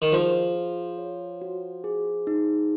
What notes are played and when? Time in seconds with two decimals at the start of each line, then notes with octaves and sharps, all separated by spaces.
0.02 D#3
0.12 F3 G#4
0.56 F4
0.98 C#5
1.42 F#4
1.84 G#4
2.27 D#4